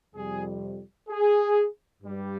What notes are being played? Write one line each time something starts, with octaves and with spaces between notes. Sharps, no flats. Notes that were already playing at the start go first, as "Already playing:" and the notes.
F2 C3 G3 G#4
G#4
G2 G3